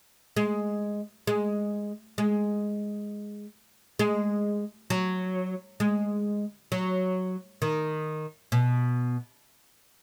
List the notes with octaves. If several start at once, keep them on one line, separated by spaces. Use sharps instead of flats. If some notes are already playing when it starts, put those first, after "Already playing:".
G#3
G#3
G#3
G#3
F#3
G#3
F#3
D#3
B2